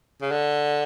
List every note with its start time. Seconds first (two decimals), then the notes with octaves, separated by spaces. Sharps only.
0.21 C#3
0.31 D3